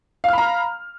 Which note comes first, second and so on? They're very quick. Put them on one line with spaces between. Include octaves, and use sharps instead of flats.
F5 F6 B5 A#5